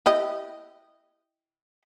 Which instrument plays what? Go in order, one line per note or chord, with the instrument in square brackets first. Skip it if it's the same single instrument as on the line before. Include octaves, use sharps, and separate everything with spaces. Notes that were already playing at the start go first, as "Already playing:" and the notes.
[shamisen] E4 G4 D#5